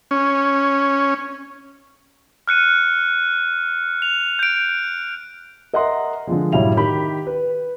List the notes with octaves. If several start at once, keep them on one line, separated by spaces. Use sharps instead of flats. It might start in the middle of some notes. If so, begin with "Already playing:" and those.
C#4
F6 F#6 C#7 D#7
F7
G6 D7
A#4 D#5 E5 F#5 A#5 C6
D3 F3 G#3
F#2 A2 G3 E4 F5 F7
D#3 G4 B5
B4